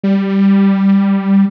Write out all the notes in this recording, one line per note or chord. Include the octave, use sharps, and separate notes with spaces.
G3